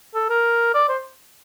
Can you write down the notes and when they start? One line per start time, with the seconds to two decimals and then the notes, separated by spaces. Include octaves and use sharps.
0.15 A4
0.30 A#4
0.74 D5
0.88 C5